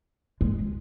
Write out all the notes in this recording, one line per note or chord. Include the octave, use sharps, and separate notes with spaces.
G#3